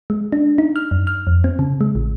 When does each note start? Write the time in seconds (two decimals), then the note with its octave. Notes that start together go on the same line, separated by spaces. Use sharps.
0.10 G#3
0.32 D4
0.58 D#4
0.76 F6
0.91 F#2
1.07 F6
1.27 F2
1.44 C4
1.59 C#3
1.81 G#3
1.95 A1